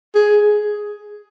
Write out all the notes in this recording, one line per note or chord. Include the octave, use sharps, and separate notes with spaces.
G#4